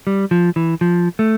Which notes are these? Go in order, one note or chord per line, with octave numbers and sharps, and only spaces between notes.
G3
F3
E3
F3
A3